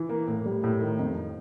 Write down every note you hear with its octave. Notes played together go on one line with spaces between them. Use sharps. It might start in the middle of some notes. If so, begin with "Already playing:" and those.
Already playing: E3
A#3
A2
G3
A2
D#3
F2